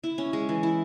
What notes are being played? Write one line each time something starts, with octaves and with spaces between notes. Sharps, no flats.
E4
C#4
G#3
E3
E4